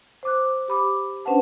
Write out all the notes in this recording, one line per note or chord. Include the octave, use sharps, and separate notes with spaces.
C5 D6 F#6
G4 B5 D6
C#4 D4 B4 C5 F#5 A5